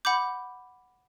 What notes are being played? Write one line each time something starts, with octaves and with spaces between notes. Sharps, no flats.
F#5 B5 D6 G6